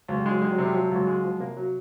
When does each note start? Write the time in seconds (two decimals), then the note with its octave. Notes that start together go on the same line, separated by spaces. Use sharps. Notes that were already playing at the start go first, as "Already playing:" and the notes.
0.08 C#2 F#3
0.19 G3
0.26 G#3
0.31 F#3
0.42 G3 G#3
0.52 F#3
0.58 C3 G3
0.74 F3 F#3
0.85 G3
0.91 C#2 F#3
1.07 G#3
1.24 F3
1.40 C3 A#3
1.57 F#3